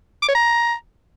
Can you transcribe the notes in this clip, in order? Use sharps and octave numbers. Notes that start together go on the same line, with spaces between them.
D6
C#5
A#5